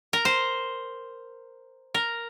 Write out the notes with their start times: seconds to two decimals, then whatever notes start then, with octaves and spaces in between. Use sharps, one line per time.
0.13 A#4
0.25 C5
1.94 A#4